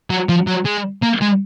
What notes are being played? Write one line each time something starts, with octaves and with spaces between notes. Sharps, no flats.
F#3
F3
F#3
G#3
A#3
G#3